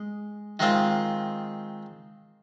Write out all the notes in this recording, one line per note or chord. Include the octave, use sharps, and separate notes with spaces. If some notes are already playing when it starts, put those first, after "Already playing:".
Already playing: G#3
D#3 G#3 C4 F4